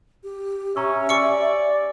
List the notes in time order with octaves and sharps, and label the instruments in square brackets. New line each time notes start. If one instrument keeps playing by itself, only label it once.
[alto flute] G4
[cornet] C#4 [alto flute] E5 [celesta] A#5 C#6 E6
[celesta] G4 G#5 [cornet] D5 [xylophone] C#6 E6 C#7